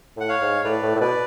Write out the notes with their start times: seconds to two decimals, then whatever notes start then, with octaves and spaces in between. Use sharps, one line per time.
0.17 A2 F#5
0.29 C#5 F5
0.42 G#2
0.64 A2 B4 D5
0.83 A2
0.95 A2
1.00 B2 B4 D5